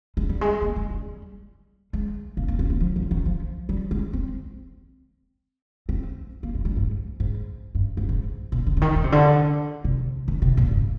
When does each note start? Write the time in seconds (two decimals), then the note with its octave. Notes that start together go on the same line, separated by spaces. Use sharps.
0.17 G#3
0.29 G3
0.41 G#3
0.62 A#3
0.76 G#3
0.90 G3
1.93 G#3
2.37 A#3
2.48 A#3
2.59 C4
2.70 A#3
2.80 F3
2.96 D#3
3.11 D#3
3.26 F3
3.69 G3
3.91 G#3
4.13 C4
5.89 C4
6.43 A#3
6.55 G#3
6.65 G3
6.77 G#2
7.20 G#2
7.75 G2
7.97 G#2
8.09 G#2
8.52 A#2
8.67 D3
8.77 D3
8.81 D#3
8.96 D3
9.04 C3
9.12 D3
9.84 C3
10.28 D#3
10.42 C3
10.57 A#2
10.71 G2